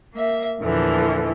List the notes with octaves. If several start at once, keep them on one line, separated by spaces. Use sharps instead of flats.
A#3 E5
E2 A#2 D3 E3 F3